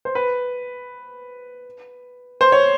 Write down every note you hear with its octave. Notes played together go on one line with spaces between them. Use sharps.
C5
B4
C5
C#5